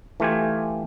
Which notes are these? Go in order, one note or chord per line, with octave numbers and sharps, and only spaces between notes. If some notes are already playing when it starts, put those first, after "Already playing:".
E3 A3 F4 G4 G#5